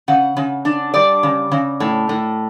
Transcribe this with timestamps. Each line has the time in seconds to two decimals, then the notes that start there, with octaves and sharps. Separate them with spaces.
0.08 C#3 F#5
0.37 C#3
0.65 D4
0.94 G3 D5
1.23 C#3
1.52 C#3
1.80 A2
2.09 A2